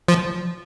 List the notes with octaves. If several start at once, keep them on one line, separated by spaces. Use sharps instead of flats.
F3